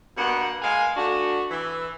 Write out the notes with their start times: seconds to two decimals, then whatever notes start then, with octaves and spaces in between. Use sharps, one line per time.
0.17 G2 B2 A#3 B3 F#5
0.62 G#3 A#4 F5 G#5
0.96 A3 D4 F#4
1.51 E3